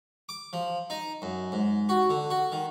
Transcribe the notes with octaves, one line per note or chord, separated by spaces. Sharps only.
D6
F3
D#4
F#2
G#2
F#4
D3
F#4
D#3